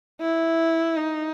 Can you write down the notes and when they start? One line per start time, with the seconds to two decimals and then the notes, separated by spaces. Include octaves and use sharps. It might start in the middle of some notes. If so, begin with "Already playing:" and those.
0.21 E4
0.97 D#4